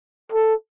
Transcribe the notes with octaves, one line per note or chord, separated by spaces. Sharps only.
A4